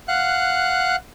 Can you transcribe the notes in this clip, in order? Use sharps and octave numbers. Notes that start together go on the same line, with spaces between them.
F5 F#5 F#6